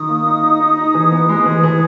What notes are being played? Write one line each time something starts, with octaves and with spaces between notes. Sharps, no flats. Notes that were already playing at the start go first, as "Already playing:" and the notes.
Already playing: D#3 D#6
A#3
D#4
D#4
D#4
D#4
E3
B3
G#3
E3
E3